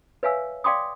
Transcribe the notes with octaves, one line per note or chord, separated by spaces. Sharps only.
B4 C#5 E5 F5 G#5 E6
D5 F5 G5 C6 D6 D#6